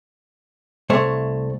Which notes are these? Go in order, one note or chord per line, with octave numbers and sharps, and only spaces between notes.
C2 A3 C5 C#5